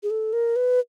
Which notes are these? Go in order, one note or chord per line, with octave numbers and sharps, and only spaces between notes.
G#4
A4
A#4
B4